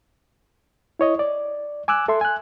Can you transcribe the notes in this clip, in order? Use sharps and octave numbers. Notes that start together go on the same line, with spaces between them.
E4 C#5 D#5
D5
G#5 D6 E6 F#6
A4 E5 C6
G#5 F#6